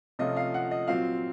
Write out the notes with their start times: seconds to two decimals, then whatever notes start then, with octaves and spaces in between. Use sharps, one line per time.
0.19 C3 F3 A3 C#4 F4 D#5
0.37 F5
0.54 F#5
0.71 D#5
0.88 A#2 F#3 C4 F4 F5